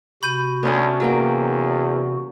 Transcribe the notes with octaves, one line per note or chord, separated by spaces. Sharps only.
C3 F#4 B5 G6 D#7
D2 B3 C#4 D4
E2 F#3 A#3 G5